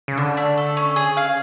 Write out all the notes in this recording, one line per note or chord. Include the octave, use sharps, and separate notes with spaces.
C#3
D3 D4
A3
A4
C#4
C#3 G#4
F5